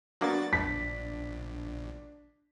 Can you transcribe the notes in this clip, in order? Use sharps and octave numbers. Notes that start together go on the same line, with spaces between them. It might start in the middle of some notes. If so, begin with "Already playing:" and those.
F#3 A#3 B3 D4 F#4 A6
A#1 B6